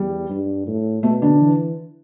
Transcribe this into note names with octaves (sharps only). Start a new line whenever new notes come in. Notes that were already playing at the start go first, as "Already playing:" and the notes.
Already playing: E2 G3
G2
A2
B2 A3
D3 D4
E3